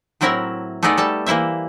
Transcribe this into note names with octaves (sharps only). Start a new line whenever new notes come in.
A2 F#3 C4 E4 A#4 E5
A3 B3 D#4 G#4 A4 D5
G3 A4 A5
E3 A#3 E4 C5 E5